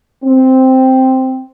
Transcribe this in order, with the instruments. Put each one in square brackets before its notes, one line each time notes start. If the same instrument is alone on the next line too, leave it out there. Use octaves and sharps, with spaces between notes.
[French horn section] C4